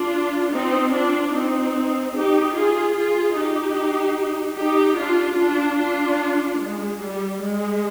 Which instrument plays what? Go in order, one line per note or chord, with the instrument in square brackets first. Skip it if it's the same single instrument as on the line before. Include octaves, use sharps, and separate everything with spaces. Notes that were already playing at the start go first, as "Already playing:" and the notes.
Already playing: [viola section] D4 F4
C4 D#4
D4 F4
C4 D#4
D#4 G4
F4 G#4
F4 G#4
D#4 G4
D#4 G4
D4 F4
D4 F4
D4 F4
G#3
G3
G#3